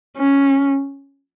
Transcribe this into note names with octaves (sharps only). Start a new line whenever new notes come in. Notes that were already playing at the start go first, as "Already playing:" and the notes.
C#4